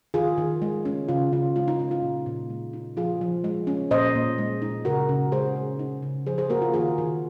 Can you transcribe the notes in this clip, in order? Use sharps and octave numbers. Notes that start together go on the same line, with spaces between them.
D#3 F4 G#4
D#3
G#3
C#4
C#3 F4
C#3 F4
G#3 F4
D#4
C#4 F4
F4
A#2
A#2
G#3
D#4
F3 F4 G#4
F3
G#3
C#4
A#2 C5 D#5
A#2
G#3
D#4
C#3 F#4 A#4
C#3
G#3 G#4 C5
C#4
D#4
C#3
F3 G#4 C5
G#4 C5
A#3 F#4 A#4
F4
D#3 F4 G#4
D#3